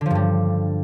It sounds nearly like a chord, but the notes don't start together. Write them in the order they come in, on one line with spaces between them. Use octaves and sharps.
D3 F3 G2 G3